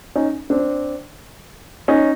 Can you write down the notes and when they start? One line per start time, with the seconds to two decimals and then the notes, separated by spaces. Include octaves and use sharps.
0.15 C#4 D#4
0.50 C4 D4
1.88 C#4 D#4